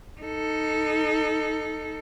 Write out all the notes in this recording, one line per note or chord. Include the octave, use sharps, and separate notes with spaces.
D#4 A4